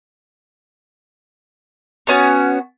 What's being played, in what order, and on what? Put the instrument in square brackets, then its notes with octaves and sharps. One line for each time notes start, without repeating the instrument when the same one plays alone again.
[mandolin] B3 C#4 F#4